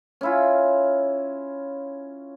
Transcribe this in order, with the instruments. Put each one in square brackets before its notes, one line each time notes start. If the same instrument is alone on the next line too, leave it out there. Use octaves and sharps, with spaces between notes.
[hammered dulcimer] C#4 E4 F4